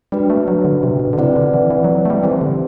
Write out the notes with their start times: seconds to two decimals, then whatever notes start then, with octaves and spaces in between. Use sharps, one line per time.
0.12 G3 D4 F#4 B4
0.30 A3
0.48 F#3
0.65 D3
0.83 C3
1.00 B2
1.13 D3
1.18 C3 C4 E4 B4 D5 F#5
1.36 D3
1.54 E3
1.71 E3
1.84 F#3
2.05 A3
2.10 G3
2.23 E3 C4 E4 G4 C5
2.41 D3